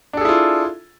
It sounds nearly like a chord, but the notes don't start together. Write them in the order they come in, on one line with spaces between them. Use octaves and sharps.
D4 A4 G#4 E4 F4